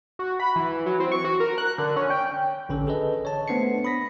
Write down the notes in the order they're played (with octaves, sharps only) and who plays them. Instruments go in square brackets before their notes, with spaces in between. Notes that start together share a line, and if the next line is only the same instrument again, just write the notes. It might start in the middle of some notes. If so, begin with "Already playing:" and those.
[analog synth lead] F#4
B5
E3
F#3
C4
C#6
F#4
A#4
F#6
D3
C#4
G5
[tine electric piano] A1 D3 C#4 A4
G#4 A4 B4 D#5
C#5 A5
A3 B3 D4 C5 C7 C#7
B5 D#6 A#6 B6